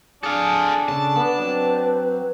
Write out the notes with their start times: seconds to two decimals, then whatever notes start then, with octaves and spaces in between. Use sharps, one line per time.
0.23 D4 G#4 A4 F5
0.88 C#3 A4 A5
1.16 B3 B4
1.38 F#3 C4